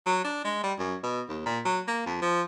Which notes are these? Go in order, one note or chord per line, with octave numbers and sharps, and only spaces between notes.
F#3
D4
G#3
G3
F#2
B2
D#2
A#2
F#3
A#3
F2
F3